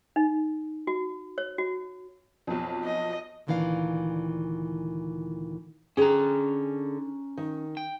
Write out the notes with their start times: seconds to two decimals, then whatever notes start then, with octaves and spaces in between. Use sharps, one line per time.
0.16 D#4
0.87 F#4
1.38 C#5
1.58 F#4
2.47 B1 F2
2.85 D#5
3.47 D2 A#2 D#3 E3 D4 F5
5.97 D3 C#4 G#4 G5 A#5
7.37 D#3
7.77 G5